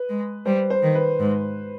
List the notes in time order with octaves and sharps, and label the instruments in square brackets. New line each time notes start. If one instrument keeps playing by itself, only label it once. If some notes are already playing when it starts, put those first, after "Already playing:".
Already playing: [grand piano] B4
[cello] G#3
[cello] G3 [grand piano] C5
[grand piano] C5
[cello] D#3
[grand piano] B4
[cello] G#2